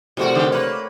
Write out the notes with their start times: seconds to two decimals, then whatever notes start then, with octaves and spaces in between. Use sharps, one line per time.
0.17 A2 C3 A3 F#4 A#4
0.35 D3 G4
0.52 A#3 B4 C#5